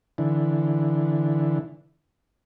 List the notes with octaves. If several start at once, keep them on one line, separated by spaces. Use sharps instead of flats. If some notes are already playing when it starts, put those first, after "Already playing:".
D3 E3